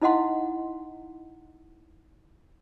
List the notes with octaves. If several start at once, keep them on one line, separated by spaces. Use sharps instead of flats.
D#4 E4 D#5 F5 F#5 C6